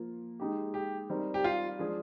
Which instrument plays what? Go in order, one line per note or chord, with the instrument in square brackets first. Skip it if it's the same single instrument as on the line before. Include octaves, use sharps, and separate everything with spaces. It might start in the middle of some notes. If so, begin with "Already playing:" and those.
Already playing: [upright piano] F3 A#3 F4
G#3 D#4 G4
[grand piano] G4
[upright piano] G3 C4 D#4 A#4
[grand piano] G4
F4
[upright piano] F3 G#3 D4 G#4